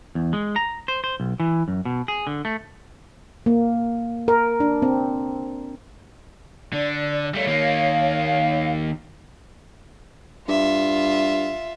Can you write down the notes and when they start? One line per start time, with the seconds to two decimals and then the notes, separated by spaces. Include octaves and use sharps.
0.15 E2
0.33 G#3
0.56 A#5
0.88 C5
1.04 C5
1.20 B1
1.40 E3
1.68 F#2
1.85 B2
2.08 G#4
2.27 D3
2.45 A3
3.46 A#3
4.28 A#4
4.60 D4
4.82 C4
6.73 D3 D5
7.34 G3 A3 C#5 F5
7.47 D#3 A#3
10.48 G2 F4 E5